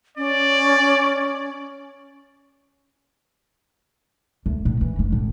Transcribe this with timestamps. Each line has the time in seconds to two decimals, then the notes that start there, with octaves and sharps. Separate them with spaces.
0.17 C#4 D5
4.46 D2
4.65 A2
4.81 E3
4.99 F1
5.12 A2